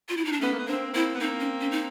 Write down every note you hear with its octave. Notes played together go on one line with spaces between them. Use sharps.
F4
E4
D#4
D4
A3 B3 C#4
A#3
B3
A#3 C4 D4
A#3 C4 E4
B3
A#3 C4 D#4
C#4
C#4
D#4